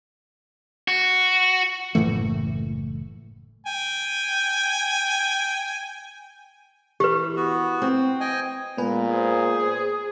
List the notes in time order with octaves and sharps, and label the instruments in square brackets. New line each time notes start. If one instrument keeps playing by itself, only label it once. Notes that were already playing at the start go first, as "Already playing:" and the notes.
[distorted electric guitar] F#4
[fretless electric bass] F#1 A2 E3 A3
[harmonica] G5 G#5
[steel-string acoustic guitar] E3 [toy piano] G4 B4
[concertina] B3 F#4
[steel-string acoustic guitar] C4
[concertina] D#5 G5 G#5
[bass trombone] A#2 [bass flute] G#3 [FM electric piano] B3 B4 G#5
[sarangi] G#4 [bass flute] C5